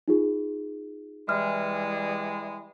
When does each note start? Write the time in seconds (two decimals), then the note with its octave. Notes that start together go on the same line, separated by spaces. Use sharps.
0.08 D#4 F4 G#4
1.29 E3 G3 G#3 F6